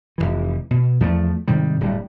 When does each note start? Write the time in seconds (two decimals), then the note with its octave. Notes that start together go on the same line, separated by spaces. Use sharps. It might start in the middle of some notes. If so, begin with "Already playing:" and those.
0.18 F1 A#1 E3
0.71 B2
1.00 E2 F3 F#3 A3
1.48 G#2 C3 D#3 G3
1.80 D1 G2 G3